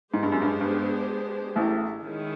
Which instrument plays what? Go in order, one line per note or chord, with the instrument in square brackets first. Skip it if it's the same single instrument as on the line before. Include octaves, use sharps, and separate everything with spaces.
[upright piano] G#2 [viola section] G#3 B3 D4 G4 C5
[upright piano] G2
F#2
G2
G2
A1 A2
[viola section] D#3 G#3 C#4 E4 G#4